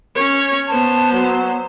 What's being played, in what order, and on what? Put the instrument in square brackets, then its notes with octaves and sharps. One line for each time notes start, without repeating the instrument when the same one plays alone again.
[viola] C#4 C#5
[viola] B3 C5 [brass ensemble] A5
[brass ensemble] F#3